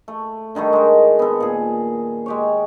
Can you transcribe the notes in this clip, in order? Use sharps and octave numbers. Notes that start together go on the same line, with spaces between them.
A3
D3 D#3 G3 A3
G#3 A#4
B3 A4
A#2 G#4
G#3 G4 C#5